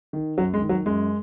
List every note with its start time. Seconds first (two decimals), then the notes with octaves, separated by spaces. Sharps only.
0.13 D#3
0.38 F#2 F#3
0.54 G#3
0.61 D#3
0.69 F#3
0.86 F#2 G#3